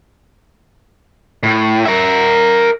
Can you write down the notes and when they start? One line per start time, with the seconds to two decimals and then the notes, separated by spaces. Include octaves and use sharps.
1.43 A2
1.85 A#4 E5